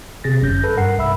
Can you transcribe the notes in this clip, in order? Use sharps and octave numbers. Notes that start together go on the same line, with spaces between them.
C3 G#4 A6 A#6
G1 F#2 C#4 G6 A#6
A4 B4
G2 A#4 F#5 C7
C2 E5 B5 E6